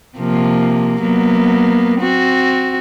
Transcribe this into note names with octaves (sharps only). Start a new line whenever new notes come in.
C3 F3 A#3
F#3 A#3 B3
C4 F#4